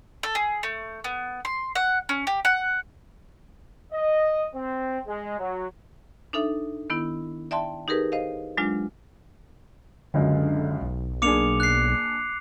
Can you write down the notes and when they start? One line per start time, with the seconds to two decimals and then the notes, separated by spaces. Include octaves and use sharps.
0.23 A4
0.35 G#4
0.63 A3
1.04 B3
1.45 C6
1.75 F#5
2.09 C#4
2.27 G4
2.45 F#5
3.92 D#5
4.55 C4
5.08 G#3
5.39 F#3
6.33 D4 D#4 A4 E5
6.90 D#3 B3 E4
7.51 D5 E5 G5 A5 C6
7.88 D#4 G4 G#4 A#4 B4
8.12 C5 D#5 F5
8.57 F#3 G#3 D4 F4
10.14 C#2 F#2 D3 G#3
10.82 B1
11.22 A#3 D4 G#4 D6 C#7 F7
11.60 F#6 C7